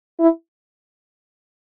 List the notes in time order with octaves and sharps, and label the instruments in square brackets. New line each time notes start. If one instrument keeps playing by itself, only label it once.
[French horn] E4